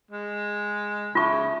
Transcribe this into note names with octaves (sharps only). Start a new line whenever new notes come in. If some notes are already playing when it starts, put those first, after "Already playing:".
G#3
C#3 F4 E5 A5 C#6 D#6